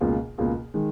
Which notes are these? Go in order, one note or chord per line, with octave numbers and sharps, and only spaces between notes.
C#2 B2 A#3 F4 G#4
C#2 B2 A#3 F4 G#4
D#3 G#3